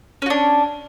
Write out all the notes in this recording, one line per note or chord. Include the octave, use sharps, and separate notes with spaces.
C#4 D4 F#4